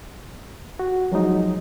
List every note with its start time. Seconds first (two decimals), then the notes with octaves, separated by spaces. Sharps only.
0.79 F#4
1.12 F3 F#3 G#3 D#4